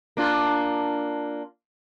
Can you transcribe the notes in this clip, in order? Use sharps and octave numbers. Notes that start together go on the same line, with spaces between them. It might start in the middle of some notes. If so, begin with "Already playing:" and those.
A#3 D4 F4